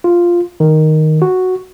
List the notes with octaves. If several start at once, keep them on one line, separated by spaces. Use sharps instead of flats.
F4
D#3
F#4